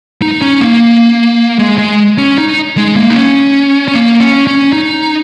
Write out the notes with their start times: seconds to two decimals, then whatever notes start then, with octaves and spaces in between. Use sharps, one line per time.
0.22 D#4
0.42 C#4
0.61 A#3
1.59 G#3
1.78 G#3
2.18 C#4
2.38 D#4
2.77 G#3
2.96 A#3
3.10 D#4
3.16 C#4
3.88 C#4
3.94 A#3
4.20 C#4
4.47 C#4
4.73 D#4